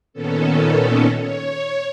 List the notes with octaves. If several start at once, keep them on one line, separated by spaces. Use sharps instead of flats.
A#2 D#3 B3 C#4 A4
C#5